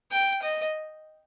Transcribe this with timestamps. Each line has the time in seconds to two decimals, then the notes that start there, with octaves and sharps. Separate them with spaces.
0.11 G5
0.42 D#5